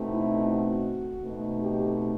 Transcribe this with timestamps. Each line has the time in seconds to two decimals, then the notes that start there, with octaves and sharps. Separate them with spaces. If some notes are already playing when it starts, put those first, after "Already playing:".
Already playing: B2 A3 C4 D#4
0.09 E4
0.47 F#4
1.23 B2 A3 C4 D#4
1.61 G4